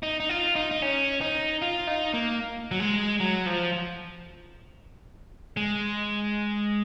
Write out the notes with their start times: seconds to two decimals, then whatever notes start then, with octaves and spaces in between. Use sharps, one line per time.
0.03 D#4
0.20 D#4
0.29 F4
0.56 D#4
0.71 D#4
0.82 C#4
1.21 D#4
1.62 F4
1.87 D#4
2.14 A#3
2.71 F#3
2.80 G#3
3.20 F#3
3.46 F3
5.57 G#3